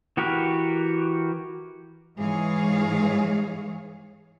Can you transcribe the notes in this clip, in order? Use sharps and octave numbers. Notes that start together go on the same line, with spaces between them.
E3 F#4 G4 A#4 B4
G#2 E3 G#3 G#4 C#5 F5